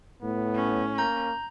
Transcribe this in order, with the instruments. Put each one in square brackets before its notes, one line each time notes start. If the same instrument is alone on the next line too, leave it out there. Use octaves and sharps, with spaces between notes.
[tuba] A2 [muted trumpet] B3
[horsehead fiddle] C#4
[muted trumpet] A#3 [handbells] A#5 G6